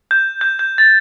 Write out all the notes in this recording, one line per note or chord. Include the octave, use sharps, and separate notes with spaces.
G6
G6
G6
A6